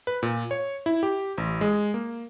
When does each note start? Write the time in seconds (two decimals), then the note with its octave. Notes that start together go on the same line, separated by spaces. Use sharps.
0.07 B4
0.23 A#2
0.51 C#5
0.86 E4
1.03 G4
1.38 A1
1.61 G#3
1.94 A#3